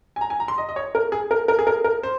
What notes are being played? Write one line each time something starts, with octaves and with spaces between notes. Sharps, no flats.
G#5
A#5
G#5
A#5
C6
D#5
D#5
C#5
A#4
G#4
A#4
A#4
G#4
A#4
A#4
C5